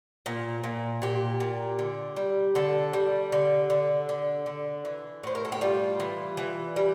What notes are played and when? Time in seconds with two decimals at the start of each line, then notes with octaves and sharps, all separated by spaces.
0.26 A#2
0.64 A#2
1.02 A#2 G4
1.40 A#2
1.79 D3
2.16 G3
2.55 D3 A4
2.93 G3
3.32 D3
3.70 D3
4.09 D3
4.46 D3
4.85 E3
5.23 A2 C5
5.35 A#4
5.45 A4
5.52 G4
5.61 G3 F4
6.00 E3
6.37 E3
6.76 G3